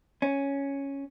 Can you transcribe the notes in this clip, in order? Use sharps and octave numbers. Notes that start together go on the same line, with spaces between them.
C#4